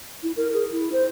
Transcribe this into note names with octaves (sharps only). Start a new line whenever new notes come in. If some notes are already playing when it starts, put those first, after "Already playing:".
E4
A#4
G#4
E4
C5